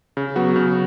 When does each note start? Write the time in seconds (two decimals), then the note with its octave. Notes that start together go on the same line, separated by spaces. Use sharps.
0.17 C#3
0.36 F#3 B3 F#4
0.56 C#3